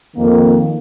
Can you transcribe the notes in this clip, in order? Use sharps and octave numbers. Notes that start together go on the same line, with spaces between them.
F2 D#3 A#3